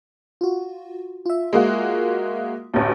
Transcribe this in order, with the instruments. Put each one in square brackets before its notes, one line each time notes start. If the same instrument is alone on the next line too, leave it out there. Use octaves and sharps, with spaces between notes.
[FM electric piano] F4 F#4
F4 E5
[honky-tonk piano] G#3 A#3 F#4
A1 D2